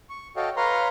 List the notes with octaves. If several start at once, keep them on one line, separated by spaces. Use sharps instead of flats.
C#6
F#4 A4 C#5 D#5 F5 G5
B4 C#5 F5 A#5 C6